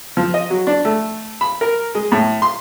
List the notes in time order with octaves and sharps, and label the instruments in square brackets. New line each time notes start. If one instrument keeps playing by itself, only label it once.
[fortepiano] F3
D#5
F#3
D4
A3
B5
A#4
G#3
A2
C6